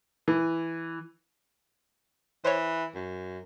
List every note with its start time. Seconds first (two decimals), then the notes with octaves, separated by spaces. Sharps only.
0.28 E3
2.45 E3 C5 C#5
2.94 F#2